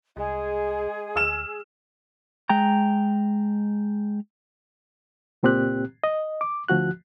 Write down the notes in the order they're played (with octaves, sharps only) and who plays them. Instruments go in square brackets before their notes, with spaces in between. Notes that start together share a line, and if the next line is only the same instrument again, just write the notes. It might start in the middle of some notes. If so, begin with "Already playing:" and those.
[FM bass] C2 [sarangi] G#3 [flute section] G#4
[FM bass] D2 [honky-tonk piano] E6 F6 E7
[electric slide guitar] G#3 G5 A#5
[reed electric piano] C#2 A#2 C4 G4 F#6
D#5
D6
D2 F3 F#4 F#6